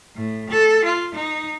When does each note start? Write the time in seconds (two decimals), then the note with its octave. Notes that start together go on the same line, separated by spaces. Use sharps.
0.15 A2
0.50 A4
0.85 F4
1.15 D#4